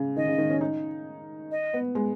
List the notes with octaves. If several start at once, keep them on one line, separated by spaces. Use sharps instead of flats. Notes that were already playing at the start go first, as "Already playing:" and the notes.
Already playing: C#3
D#3 D#5
C#3
D#3
C#4
D#4
D#5
B3
G#3